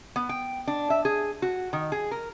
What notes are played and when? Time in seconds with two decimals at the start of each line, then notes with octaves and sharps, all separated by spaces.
0.16 B3
0.29 G5
0.67 D4
0.90 E5
1.05 G#4
1.42 F#4
1.73 D#3
1.92 G#4
2.11 A#4